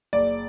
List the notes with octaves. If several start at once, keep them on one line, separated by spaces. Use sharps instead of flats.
F#1 D5